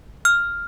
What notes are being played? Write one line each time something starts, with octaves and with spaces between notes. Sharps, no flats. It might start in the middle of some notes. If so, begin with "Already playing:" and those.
F6